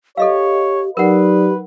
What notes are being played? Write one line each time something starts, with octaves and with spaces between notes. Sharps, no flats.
G4 A4 C#5 D#5 F5
F#3 D#4 G4 A#4 B4 D5 F#5